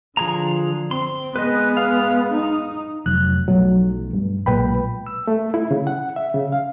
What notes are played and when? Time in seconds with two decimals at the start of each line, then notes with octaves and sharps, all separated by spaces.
0.17 D3 F3 G#4 A#5
0.91 C4 C6
1.36 G#3 B3 B4 D#5
1.77 F5
2.33 D#4
3.06 F1 F#3 F#6
3.48 B1 F3 F#3 A3
4.13 G2
4.46 B1 A#2 G#3 B4 G5 B5
5.07 E6
5.27 A3
5.54 E4
5.71 C#3
5.87 F#5
6.16 E5
6.34 C#3
6.52 F5